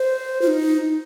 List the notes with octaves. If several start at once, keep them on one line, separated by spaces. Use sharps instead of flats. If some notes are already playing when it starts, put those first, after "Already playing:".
Already playing: C5
F4
D#4